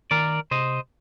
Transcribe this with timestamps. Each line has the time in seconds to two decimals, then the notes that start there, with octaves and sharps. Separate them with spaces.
0.11 D#3 A#4 D5
0.51 C3 C5 D#5